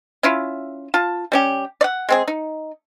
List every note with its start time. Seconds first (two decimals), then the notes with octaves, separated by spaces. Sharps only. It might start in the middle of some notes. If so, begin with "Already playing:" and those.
0.23 C#4 E4 F4
0.94 F4 A5
1.32 G3 C#4 G4
1.81 D5 F#5
2.09 G#3 C4 G#4
2.28 D#4